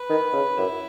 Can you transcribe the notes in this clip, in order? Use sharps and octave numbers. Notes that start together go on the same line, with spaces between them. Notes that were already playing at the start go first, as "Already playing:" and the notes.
Already playing: B4
D#3
C#3
F#2 E4